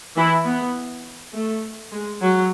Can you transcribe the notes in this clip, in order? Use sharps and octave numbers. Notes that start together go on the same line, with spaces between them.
E3 E4
B3
A3
G#3
F#3